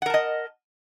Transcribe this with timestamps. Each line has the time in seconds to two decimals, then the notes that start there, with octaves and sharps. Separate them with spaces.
0.02 F#5
0.06 A#4
0.10 A5
0.14 D#5